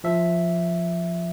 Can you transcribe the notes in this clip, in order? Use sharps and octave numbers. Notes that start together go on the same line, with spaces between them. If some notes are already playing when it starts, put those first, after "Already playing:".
F3 E5